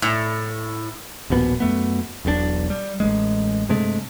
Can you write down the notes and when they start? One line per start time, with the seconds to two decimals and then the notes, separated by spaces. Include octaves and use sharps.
0.02 A2
1.30 D#1 A#1 B2 B3
1.60 F#2 A3 B3
2.25 E1 B1 A#2 D4
2.70 G3
3.00 A1 G#3
3.69 G2 C3 G#3 A3